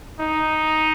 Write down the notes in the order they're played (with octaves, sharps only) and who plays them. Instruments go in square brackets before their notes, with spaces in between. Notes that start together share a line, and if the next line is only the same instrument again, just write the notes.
[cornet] D#4